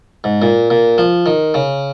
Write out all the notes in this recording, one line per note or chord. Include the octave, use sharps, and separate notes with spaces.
G#2
A#2
A#2
F3
D#3
C#3